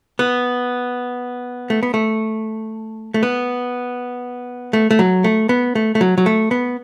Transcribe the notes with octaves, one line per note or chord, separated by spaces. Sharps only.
B3
A3
B3
A3
A3
B3
A3
A3
F#3
A3
B3
A3
A3
F#3
F#3
A3
B3